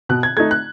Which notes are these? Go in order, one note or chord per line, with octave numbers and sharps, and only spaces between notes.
B2 F#6
G#6
A3 D#4 G#6
F#6